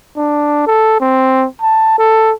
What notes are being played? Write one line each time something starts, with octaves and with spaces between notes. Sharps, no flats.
D4
A4
C4
A5
A4